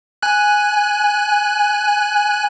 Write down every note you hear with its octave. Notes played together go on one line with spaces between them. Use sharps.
G#5 F#6